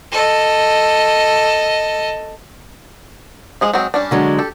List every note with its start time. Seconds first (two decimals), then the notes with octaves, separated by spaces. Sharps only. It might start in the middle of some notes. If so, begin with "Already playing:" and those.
0.12 A4 D#5
3.61 F3 G#3 G#4
3.73 F#3 G#3 C4
3.94 G3 C#4 D4
4.11 D3 F#3 G#3
4.39 G4 A4